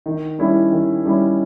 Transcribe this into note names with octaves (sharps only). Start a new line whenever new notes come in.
D#3
G3 C#4 E4
D#3
G3 C#4 E4